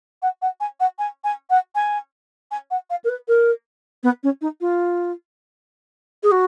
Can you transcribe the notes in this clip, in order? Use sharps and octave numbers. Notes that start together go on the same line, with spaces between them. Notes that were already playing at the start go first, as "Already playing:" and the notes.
F#5
F#5
G#5
F#5
G#5
G#5
F#5
G#5
G#5
F#5
F5
A#4
B4
A#4
B3
C#4
D#4
F4
G#4
F#4